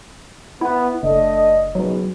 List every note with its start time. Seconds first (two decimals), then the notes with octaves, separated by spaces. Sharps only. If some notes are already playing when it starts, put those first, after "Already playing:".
0.61 B3 E4
1.03 F#1 A3 D4 D#5
1.75 F#1 G#2 B2 F#3